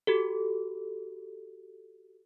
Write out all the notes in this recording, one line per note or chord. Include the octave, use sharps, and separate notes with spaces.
F#4 G4 A4